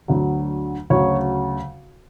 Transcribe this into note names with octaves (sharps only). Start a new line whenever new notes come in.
D2 D3 F#3
D2 C#3 F#3 C#5